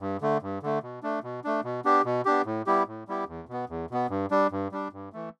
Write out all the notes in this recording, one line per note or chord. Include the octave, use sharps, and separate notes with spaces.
G2
D3 A3
G2
D3 A3
B2
A3 D4
B2
A3 D4
B2
B3 D4 G4
B2
B3 D4 G4
A2
G3 B3 E4 G4
A2
G3 B3 E4 G4
E2
B2 B3
E2
B2 B3
G2
G3 D4
G2
G3 D4
G2
E3 A3